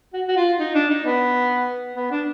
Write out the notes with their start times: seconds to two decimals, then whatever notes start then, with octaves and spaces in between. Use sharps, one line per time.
0.13 F#4
0.28 F#4
0.36 F4
0.59 D#4
0.74 D4
0.90 D#4
1.05 B3
1.96 B3
2.11 D4